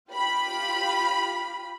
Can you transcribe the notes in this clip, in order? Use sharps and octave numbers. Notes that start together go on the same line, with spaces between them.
F4 G4 B5